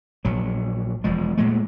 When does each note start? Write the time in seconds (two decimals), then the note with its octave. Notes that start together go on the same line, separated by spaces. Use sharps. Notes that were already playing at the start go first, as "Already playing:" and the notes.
0.25 A#1 F#3
1.04 E1 F3 G#3
1.37 A#2 G#3 A3